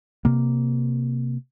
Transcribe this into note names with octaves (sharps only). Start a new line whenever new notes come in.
C3 A#3